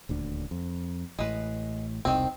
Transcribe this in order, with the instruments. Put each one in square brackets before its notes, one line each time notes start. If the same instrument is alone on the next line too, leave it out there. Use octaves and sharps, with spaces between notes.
[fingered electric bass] D#1 D2 D3
F2
[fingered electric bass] A1 A2 [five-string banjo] G#3 B4
[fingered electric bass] E1 C2 C3 [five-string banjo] D#3 C4